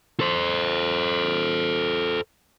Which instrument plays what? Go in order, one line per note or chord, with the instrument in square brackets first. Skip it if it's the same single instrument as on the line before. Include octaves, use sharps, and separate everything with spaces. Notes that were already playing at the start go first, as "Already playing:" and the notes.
[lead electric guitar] A4 C5